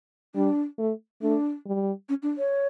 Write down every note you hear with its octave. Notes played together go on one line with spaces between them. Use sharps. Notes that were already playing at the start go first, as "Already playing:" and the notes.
G3 D4
A3
A3 D4
G3
C#4
D4
C#5